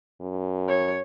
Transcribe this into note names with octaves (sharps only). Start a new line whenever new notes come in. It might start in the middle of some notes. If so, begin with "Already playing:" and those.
F#2
C#5